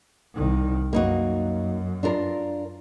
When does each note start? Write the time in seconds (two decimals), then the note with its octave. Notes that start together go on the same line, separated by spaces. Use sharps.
0.35 C2 D#3
0.93 F#2 A#3 D#4 F#4
2.03 D4 F4 A#4